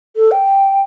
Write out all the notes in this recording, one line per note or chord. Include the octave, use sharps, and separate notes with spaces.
A4
G5